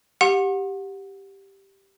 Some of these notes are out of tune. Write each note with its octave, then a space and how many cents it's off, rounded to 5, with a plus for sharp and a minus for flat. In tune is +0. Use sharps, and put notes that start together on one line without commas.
G4 -5 F#5 -25 C6 +45